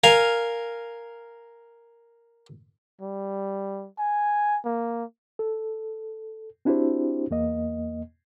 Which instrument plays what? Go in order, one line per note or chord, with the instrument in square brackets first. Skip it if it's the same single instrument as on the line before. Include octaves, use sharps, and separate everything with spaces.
[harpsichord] A#4 F5 G#5
[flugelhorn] G3
G#5
A#3
[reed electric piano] A4
C4 D4 E4 F#4 G4 C5
E2 A#3 D#5